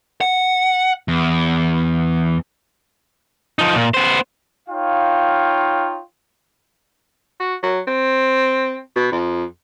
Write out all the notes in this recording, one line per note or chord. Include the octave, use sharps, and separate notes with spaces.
F#5
E2
F3 D#4
A#2
B3 C5
D#4 F4 C#5 F5 G5
F#4
F#3
C4
B2
F2